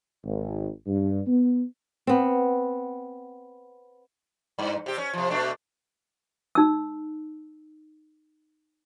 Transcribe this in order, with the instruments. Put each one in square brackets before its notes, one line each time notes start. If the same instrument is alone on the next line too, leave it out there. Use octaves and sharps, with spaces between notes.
[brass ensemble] G#1
G2
B3
[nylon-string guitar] B3 C4
[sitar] G2
C3 G4
C#4
C3 F3
B2 A3 D4
[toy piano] D#4 E6